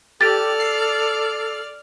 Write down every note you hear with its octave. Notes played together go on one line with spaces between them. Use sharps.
G4 A4 D5 F6 A6
C7